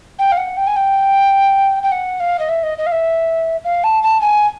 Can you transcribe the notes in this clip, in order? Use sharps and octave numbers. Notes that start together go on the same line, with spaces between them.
G5
F5
F#5
G5
G#5
G5
G5
F#5
F5
D#5
E5
D#5
D#5
F5
E5
F5
A5
A5
G#5